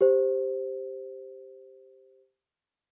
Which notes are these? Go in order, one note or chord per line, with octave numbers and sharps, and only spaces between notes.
G4 C5